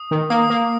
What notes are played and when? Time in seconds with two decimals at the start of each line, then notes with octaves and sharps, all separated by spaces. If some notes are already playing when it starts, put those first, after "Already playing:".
Already playing: D#6
0.11 D#3
0.30 A#3 D#6
0.50 A#3